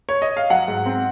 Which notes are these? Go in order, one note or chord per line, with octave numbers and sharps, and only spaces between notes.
C#5
D#5
F5
F#3 F#5
G#2
C4